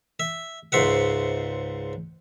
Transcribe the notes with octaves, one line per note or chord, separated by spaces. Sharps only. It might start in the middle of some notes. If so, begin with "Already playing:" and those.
E5
C#2 G#2 C5 E5 F#5